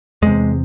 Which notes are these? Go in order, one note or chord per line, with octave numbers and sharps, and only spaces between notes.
E2 C3 G#3